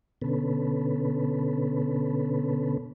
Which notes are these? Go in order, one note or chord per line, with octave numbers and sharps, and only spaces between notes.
B2 D3 B3 C#4 A4 B4